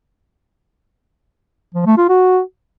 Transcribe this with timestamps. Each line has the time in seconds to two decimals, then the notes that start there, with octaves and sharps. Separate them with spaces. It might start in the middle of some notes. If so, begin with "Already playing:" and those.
1.74 F3
1.86 A3
1.97 F4
2.09 F#4